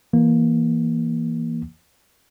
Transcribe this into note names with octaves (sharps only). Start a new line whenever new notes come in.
E3 A#3